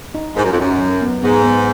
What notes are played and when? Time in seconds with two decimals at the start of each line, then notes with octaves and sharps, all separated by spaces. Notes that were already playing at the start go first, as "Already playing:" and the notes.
0.15 D#4
0.36 G#2 A#4
0.44 F#2
0.51 F2
0.57 F#2 D#4
0.79 F#3
1.01 B3
1.22 G#2 B3
1.43 B3